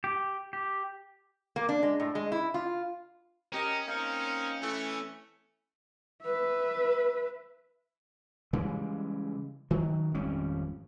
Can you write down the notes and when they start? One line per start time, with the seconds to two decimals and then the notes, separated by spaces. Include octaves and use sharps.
0.04 G4
0.53 G4
1.56 A#3
1.69 D4
1.83 G#3
2.00 A2
2.15 G#3
2.32 E4
2.54 F4
3.52 C#4 G4 A#4 D#5
3.85 A#3 C4 D#4
4.60 E3 A3
6.23 B4 E5
8.53 C#3 E3 G3 G#3
9.71 D#3 F#3
10.14 G#1 F2 G3 C#4